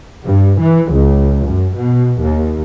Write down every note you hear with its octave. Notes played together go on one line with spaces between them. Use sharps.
G2
E3
C#2
F#2
B2
D#2